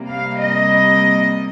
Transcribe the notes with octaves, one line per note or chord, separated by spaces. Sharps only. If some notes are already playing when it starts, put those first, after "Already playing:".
Already playing: C3 G3 A#3
F5
D#5